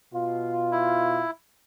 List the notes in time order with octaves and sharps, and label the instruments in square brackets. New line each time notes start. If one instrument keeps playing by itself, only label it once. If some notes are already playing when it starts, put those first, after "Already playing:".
[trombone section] B2 F4
[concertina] E4